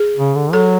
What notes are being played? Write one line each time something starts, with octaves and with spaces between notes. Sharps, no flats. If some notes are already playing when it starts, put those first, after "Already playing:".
Already playing: G#4
C#3
D3
F#3 A4